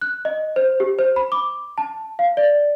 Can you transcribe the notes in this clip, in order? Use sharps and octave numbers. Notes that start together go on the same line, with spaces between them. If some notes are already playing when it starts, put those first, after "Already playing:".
F#6
D#5
C5
G4
C5
B5
D6
A5
F5
D5